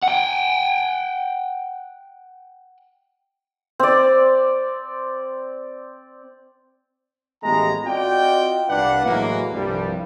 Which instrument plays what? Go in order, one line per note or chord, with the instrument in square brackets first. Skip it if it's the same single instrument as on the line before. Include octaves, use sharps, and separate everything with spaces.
[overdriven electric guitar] F#5 G5
[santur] C4 D5
[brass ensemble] A1 G#3 A3 B3 G4 A#5
C4 F4 F#4 D5 D#5 G5
C2 D4 B4 D5 F5 F#5
A2 E3 F#3 G#3 A#3
C2 G2 F3 G3